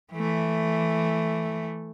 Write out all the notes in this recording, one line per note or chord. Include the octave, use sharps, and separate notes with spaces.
E3 A3